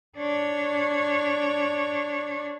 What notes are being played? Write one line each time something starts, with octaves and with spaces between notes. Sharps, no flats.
D4 C#5